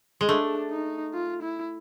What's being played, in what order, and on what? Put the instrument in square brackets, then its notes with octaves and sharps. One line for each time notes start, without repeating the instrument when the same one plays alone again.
[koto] G#3
[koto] A3 [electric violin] D4
[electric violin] D#4
F4
E4